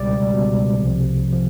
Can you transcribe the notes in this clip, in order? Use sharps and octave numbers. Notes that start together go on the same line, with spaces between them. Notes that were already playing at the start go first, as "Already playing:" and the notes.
Already playing: C#2 B2 G3 D5
C#2 B2 G3
C2 C3 F3
C3 F3